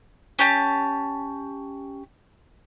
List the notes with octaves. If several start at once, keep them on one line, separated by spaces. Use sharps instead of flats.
C#4 G4 A5